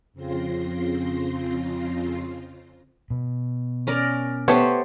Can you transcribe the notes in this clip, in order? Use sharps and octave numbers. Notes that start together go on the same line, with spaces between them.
F2 C#3 C4 F4 C6 A#6
B2
C#4 A#4 D5
A3 B3 G4 C5 C#5